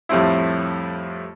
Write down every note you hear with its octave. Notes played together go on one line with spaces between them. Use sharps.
F2 A2 G3 A3 C4 E4